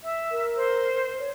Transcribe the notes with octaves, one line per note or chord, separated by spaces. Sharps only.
E5
A#4
C5
C#5